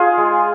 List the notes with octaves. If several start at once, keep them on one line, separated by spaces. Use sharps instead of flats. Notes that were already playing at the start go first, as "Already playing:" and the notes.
Already playing: D#4 F4 G#4
G#3